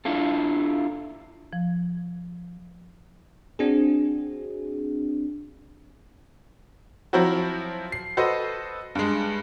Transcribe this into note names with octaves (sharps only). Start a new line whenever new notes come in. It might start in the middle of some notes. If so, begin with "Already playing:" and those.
D4 E4 F4 A4
F3
C4 D4 F#4 G#4
F3 F#3 C4 E4 F#4
C7
F#4 A4 B4 C5 D#5
G2 G#3